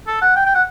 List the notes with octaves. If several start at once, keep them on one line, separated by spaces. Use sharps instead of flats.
A4
F#5
G5
G5
F#5